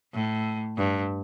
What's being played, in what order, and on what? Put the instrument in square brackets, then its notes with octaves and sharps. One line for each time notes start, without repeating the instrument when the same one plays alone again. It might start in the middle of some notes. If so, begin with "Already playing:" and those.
[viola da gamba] A2
G2